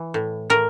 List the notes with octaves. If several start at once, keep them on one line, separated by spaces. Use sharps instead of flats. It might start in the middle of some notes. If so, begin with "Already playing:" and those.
Already playing: E3
A2
A2 A#4